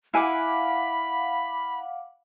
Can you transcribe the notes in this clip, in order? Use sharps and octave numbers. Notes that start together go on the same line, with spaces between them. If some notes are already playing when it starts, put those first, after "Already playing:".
E4 F5 F#5 G#5 B5 D6